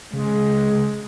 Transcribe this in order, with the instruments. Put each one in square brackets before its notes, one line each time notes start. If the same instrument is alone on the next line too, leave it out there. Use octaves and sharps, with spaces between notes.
[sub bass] C#3 [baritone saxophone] G#3